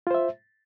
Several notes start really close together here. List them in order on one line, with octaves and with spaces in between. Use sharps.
F4 C5 E5